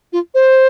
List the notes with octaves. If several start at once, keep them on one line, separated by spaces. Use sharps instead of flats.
F4
C5